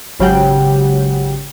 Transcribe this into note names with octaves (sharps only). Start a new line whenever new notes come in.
G#1 C#3 F#3 G4 F#5 G5